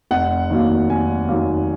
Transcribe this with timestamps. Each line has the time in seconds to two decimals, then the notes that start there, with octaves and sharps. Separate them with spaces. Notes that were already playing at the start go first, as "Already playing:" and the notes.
0.11 F1 F#5
0.50 D#2 D#3 F#3 A#3
0.90 F1 G#5
1.29 D#2 D#3 F#3 A#3